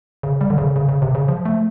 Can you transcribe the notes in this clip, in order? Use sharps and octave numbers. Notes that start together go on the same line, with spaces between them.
C#3
G3
D3
C#3
C#3
C#3
C3
C#3
F3
A3